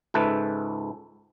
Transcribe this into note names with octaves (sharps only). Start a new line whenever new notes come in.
C#2 G#2 A4 B4 E5